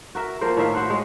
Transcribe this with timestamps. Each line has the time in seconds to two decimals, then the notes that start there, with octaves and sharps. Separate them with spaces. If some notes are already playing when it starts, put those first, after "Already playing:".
0.15 F#4 A#4 E5
0.41 F3 A#3 A#4 C5
0.57 A2 D#3 E5 F5
0.75 F#4 C5 E5 F#5
0.90 G#3